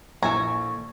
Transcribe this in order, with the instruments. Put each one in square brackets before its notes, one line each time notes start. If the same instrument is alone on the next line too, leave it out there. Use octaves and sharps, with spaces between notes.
[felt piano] A#1 E3 G#6 [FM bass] A#3 [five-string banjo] A4 G#5 A#5 [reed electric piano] C#6